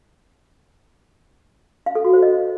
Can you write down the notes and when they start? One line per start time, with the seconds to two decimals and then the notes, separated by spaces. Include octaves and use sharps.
1.86 F5
1.95 A4
2.04 F#4
2.13 C5
2.22 D#5